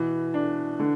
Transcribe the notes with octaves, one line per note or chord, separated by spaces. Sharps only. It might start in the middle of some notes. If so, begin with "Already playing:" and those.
Already playing: B2 E3
D4
D3